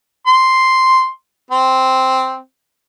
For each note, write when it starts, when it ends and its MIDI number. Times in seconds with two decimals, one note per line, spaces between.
0.27 1.09 84
1.51 2.38 60